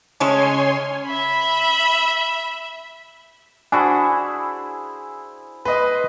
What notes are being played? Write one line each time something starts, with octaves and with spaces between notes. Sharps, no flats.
C#3 G#3 A3 C#4 C#5 G#5 C6
E5 B5
D4 E4 F#4 G#4 C5 G#5
B4 D#5 C6